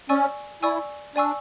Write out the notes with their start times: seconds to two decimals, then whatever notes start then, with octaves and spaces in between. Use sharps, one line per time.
0.09 C#4 D5 G#5 C#6 E6
0.62 E4 D5 G#5 C#6 E6
1.16 D4 D5 G#5 C#6 E6